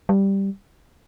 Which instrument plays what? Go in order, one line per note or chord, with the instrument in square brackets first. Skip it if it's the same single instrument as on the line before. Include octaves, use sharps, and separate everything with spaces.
[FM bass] G3